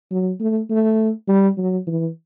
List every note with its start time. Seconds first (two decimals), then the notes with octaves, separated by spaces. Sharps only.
0.11 F#3
0.40 A3
0.70 A3
1.28 G3
1.57 F#3
1.87 E3